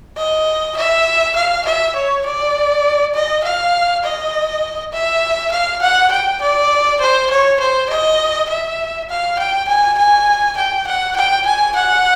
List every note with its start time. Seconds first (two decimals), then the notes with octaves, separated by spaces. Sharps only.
0.17 D#5
0.76 E5
1.36 F5
1.65 E5
1.95 C#5
2.25 D5
3.14 D#5
3.44 F5
4.03 D#5
4.93 E5
5.52 F5
5.82 F#5
6.11 G5
6.41 D5
7.00 C5
7.30 C#5
7.60 C5
7.89 D#5
8.49 E5
9.09 F5
9.39 G5
9.68 G#5
9.98 G#5
10.57 G5
10.87 F#5
11.16 G5
11.46 G#5
11.75 F#5